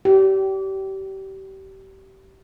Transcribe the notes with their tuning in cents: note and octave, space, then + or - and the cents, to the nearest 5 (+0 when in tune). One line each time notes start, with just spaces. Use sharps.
G4 -30